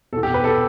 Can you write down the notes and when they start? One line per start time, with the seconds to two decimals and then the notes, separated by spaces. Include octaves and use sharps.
0.13 E2 B2 A4
0.23 G4
0.34 B4
0.44 A4